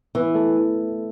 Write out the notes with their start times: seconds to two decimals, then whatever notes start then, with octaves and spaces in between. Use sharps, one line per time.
0.15 E3 B3 B4
0.35 A3 A4